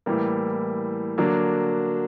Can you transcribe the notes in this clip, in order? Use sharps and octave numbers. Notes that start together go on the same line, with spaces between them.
A2 E3 G3 A#3
D3 F#3 A#3 D4